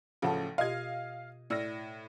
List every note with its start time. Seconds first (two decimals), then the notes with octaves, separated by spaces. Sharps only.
0.22 A1 C#3 F3 A3 F5 F#5 A5
0.58 B2 F4 G4 D#5 F5 G#6
1.50 A2 D5 E6 F6 A#6